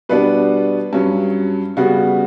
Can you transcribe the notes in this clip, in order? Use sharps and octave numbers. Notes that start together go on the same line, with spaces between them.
B2 G3 B3 D4 B4
G2 F#3 C#4
C#3 G3 B3 F#4